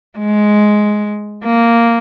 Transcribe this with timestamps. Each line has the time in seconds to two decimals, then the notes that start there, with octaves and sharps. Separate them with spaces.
0.18 G#3
1.44 A#3